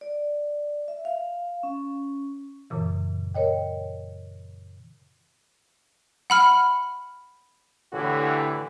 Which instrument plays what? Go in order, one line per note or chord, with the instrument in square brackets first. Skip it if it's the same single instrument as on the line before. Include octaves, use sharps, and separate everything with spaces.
[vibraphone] D5
E5
F5
C#4
[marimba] F#2 A#2 C#3 E3
A#4 C#5 D#5 G5
[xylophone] F#5 B5 F6
[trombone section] A2 D3 E3 E4 F#4 G4